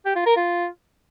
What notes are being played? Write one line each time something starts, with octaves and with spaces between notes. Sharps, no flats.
G4
F4
A#4
F4